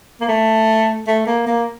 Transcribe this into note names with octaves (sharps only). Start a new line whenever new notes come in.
A#3
A3
A3
A#3
A#3